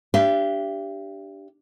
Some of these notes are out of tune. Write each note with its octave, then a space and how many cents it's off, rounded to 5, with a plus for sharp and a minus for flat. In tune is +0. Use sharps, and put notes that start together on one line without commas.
D4 +0 G4 +0 E5 +45